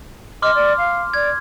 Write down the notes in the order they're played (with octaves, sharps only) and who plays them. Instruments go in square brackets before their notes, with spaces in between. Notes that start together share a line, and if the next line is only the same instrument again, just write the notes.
[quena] D#5 [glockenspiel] C6 D6 F6
[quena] D5
F5
[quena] D5 [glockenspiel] G#6